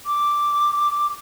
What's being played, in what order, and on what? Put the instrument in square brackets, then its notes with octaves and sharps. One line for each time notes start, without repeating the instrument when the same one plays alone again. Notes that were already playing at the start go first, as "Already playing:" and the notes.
[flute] D6